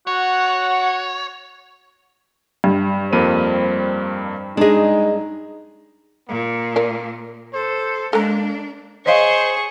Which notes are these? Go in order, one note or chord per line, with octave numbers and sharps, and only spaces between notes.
F#4 C#5 F#5
G2
F2 A#3 C5 D#7
G#3 D4 D#4 G#4 D#5
A#2 A#3
A#4 D5
A4 C5
G#3 A#3 D4 A4 A#5
G#4 C5 C#5 D#5 F5 C#6